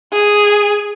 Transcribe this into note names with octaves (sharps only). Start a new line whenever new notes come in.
G#4